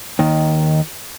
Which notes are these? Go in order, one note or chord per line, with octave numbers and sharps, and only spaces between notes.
D#2 D#3